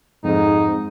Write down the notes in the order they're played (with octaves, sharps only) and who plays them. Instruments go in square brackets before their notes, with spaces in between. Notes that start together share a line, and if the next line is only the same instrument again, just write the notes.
[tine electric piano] F2 [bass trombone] G#2 [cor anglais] D#4